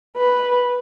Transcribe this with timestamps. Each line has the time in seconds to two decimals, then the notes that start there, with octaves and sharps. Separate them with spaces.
0.17 B4